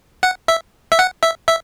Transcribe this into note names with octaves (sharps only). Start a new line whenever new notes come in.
F#5
E5
E5
F#5
E5
E5